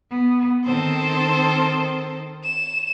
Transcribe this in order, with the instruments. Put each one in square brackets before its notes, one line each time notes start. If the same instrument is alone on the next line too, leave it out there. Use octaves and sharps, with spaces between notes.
[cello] B3
[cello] D#3 C4 [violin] A4 C5
[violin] E7